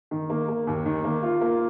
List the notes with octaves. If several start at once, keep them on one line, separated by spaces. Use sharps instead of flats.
D#3
A#3
A#3
D#2
D#3
A#3
F4
A#3